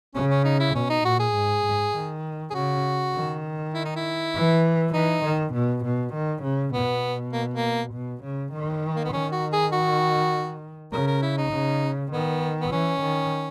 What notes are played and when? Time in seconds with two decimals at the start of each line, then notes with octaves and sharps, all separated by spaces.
0.15 C#3 C#4
0.30 C#4
0.45 D#4
0.60 E4
0.75 B2 C#4
0.90 D#4
1.04 A#2 F#4
1.20 G#4
1.34 G#2
1.65 G#2
1.95 D#3
2.51 G#4
2.54 C#3 F#4
3.14 D#3
3.74 E4
3.85 D#4
3.96 E4
4.35 E3
4.94 E3 D#4
5.24 D#3
5.53 B2
5.84 B2
6.14 D#3
6.43 C#3
6.73 B2 B3
7.33 A#3
7.54 A#3
7.92 B2
8.23 C#3
8.52 D#3
8.96 A#3
9.05 B3
9.13 D#3 C#4
9.32 F#4
9.53 G#4
9.72 F#4
10.92 C#3 A#4
11.07 A#4
11.22 E4
11.37 D#4
11.52 C#3
12.11 D#3 B3
12.61 B3
12.71 E3 C#4
13.01 D#3